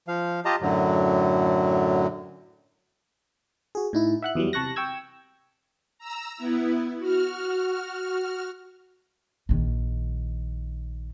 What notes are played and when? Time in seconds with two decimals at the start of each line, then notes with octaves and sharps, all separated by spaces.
0.08 F3 F5
0.45 F4 G4 D#5 A5 A#5
0.62 F#2 A2 D3 F#3
3.75 F#4 G#4
3.93 A2 D#4 E4
4.22 E5 F#5 F#6
4.35 E2 E3 F#3 G3
4.53 C3 A5 C#6 F#6 A#6
4.76 G5 C#6 E6 G#6
5.98 A#5 E6
6.37 B3 E4
6.98 F#4 F6
9.49 A#1 D#3